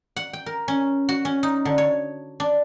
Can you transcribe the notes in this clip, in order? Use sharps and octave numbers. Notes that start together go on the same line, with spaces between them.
F#5
G5
A#4
C#4
F#4
C#4
D#4
D3
C#5
D4